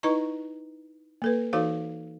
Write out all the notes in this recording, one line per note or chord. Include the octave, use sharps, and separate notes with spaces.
D#4 E4 B4 D#5 A#5 C#6
A#3 A4 B4
E3 D#4 F#4 A4 C5 F5